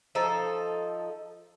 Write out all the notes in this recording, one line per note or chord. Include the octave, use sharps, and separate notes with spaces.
F3 D#4 A4